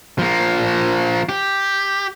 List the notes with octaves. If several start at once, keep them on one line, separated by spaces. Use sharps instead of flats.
F3 A#3
G4